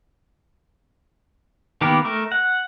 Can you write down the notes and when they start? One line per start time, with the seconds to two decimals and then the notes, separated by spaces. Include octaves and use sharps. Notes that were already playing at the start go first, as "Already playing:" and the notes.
1.81 D#3 A#3 B3 G4 A#4
2.05 A3 A#4
2.32 F#5